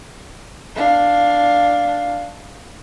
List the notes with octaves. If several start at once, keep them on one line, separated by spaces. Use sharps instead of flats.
D4 F5